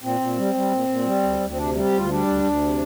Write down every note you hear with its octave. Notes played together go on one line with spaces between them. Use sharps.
A#2 C4
A#2
G3
G3
A#2
A#2
G3
D2
D2
C4
C3 D4
G3
G4
D2 F4
G3 D4
D2
D2
C3